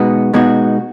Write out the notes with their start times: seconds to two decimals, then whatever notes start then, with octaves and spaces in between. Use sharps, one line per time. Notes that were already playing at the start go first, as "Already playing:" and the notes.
Already playing: B2 G#3 B3 D#4 F#4
0.34 B2 G#3 B3 D#4 F#4